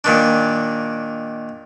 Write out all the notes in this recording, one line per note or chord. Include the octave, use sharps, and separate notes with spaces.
A#2 D#3 D4